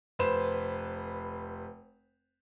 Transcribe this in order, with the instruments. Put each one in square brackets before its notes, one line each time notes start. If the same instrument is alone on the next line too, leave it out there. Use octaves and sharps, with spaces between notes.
[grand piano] F1 B4 C5 E7